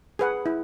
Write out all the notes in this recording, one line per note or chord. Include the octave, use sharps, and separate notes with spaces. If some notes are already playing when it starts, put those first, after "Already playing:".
G#4 B4 F#5
E4